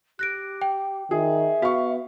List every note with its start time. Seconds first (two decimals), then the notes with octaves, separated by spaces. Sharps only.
0.19 G4 F#6 A#6 D7
0.62 G5
1.11 D#3 G#4 E5
1.62 B3 F#4 F5 C#6